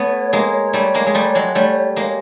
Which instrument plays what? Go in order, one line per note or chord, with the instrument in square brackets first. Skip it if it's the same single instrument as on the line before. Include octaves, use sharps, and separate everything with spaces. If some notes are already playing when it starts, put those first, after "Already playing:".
Already playing: [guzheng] A3 B3 [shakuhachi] C#5
[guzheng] G#3 A#3
G3 A3
G#3 A#3
G#3
G3 A3
F#3 G#3
G3 A3
G#3 A#3